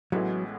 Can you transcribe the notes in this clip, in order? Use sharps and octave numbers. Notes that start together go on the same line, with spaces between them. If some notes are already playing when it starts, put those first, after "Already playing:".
A1 A2 F#3 G#3 B3 E4